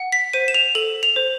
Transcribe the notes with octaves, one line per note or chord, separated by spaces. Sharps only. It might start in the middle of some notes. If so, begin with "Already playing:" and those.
Already playing: F#5
B6
C5 D#7
E7
F7
A4 F#7
F7
C5